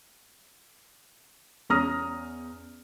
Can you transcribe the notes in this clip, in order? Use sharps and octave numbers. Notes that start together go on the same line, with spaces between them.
E2 C#4 A#5 D#6 F6 A#6